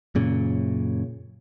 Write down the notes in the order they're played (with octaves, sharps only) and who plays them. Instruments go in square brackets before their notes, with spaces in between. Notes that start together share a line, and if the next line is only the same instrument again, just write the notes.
[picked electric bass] F#2 A#2 C#3